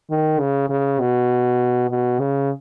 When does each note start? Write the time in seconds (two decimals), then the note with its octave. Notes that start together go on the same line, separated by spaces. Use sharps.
0.10 D#3
0.40 C#3
0.70 C#3
1.00 B2
1.90 B2
2.19 C#3